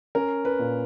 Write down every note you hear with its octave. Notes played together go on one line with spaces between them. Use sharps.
C#4 A#4
B4
A#2